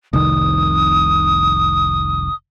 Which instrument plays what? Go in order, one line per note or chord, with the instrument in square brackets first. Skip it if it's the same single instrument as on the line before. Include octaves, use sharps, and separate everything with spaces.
[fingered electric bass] F1 C2 D#3 [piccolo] D#6